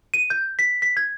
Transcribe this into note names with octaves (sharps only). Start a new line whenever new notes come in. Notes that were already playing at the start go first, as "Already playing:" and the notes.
D#7
G6
B6
B6
G#6